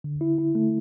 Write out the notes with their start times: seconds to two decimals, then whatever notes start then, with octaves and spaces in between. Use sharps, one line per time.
0.04 D3
0.21 E4
0.38 E4
0.55 A3